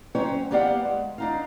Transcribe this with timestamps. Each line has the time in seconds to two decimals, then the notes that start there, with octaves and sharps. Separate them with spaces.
0.15 F#3 C4 C#4 C5 C#5
0.51 A#3 B3 G4 D5 F5 F#5
0.85 G#3
1.18 D4 D#4 F5